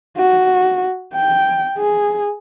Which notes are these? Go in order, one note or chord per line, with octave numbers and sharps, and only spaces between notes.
F#4
G5
G#4